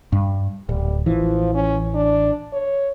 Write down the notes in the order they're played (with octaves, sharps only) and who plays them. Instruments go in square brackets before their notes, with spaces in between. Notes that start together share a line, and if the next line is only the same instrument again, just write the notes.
[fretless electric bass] G2
[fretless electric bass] D1 [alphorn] G3
[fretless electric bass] A1 E3 [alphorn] F3
[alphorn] C#4
D4
C#5